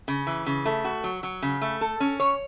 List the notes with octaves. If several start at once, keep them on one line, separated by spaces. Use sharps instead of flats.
C#3
E3
C#3
A3
F#4
F#3
F#3
C#3
A3
A4
C#4
C#5